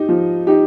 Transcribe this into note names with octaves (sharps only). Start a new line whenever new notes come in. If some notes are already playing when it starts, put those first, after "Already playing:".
Already playing: D#4 G4
F3
D#4 G4